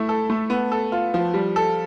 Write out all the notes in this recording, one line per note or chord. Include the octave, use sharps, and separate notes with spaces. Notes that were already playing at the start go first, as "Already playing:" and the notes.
Already playing: A3 E4
A4
A3
B3
A4
F4
F3
G3
A4